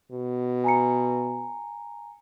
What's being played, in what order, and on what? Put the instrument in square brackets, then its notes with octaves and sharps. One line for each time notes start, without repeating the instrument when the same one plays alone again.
[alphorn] B2
[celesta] G#5 A#5 C#7